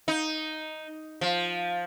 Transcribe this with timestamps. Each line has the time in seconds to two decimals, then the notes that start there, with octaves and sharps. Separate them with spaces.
0.08 D#4
1.21 F3